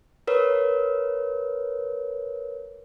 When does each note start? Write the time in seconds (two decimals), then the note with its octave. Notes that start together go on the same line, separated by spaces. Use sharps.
0.27 A#4 B4 C#5